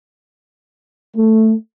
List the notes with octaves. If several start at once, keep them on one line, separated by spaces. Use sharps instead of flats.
A3